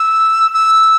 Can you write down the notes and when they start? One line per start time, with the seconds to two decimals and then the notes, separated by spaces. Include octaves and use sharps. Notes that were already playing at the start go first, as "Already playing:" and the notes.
Already playing: E6
0.54 E6